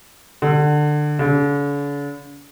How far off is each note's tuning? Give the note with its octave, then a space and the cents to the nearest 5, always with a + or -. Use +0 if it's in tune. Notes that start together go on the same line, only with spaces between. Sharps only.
D3 +20
D3 -45